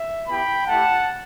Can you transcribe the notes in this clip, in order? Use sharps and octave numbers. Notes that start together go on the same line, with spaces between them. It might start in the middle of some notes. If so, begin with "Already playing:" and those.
Already playing: E5
B3 E4 G4 G5 B5
A3 E4 G4 F#5 A5